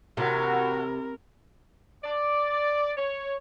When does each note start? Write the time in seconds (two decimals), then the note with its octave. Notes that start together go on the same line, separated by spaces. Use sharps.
0.17 A2 C3 F#4 A#4
2.04 D5
2.97 C#5